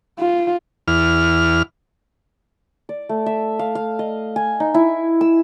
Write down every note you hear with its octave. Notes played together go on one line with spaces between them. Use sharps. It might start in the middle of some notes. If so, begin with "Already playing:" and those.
F4
E2 F6
D5
A3
E5
F5
F5
D#5
G#5
D#4
E4
E6